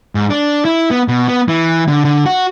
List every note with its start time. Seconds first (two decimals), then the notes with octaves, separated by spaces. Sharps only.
0.15 G#2
0.30 D4
0.65 E4
0.91 B3
1.08 B2
1.28 B3
1.48 E3
1.88 D3
2.05 D3
2.26 F#4